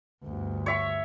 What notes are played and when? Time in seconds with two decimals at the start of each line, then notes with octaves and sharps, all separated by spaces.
0.24 G1 D2
0.66 C#5 E5 C#6